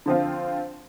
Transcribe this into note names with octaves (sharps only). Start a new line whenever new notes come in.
D3 F3 C4 F4